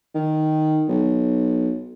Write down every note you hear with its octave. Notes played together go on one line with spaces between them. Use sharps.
D#3
B1